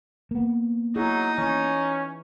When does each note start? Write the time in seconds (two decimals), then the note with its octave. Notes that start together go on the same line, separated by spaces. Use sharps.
0.31 A#3 B3
0.96 F#3 D#4 E4 G#4
1.38 E3 C#4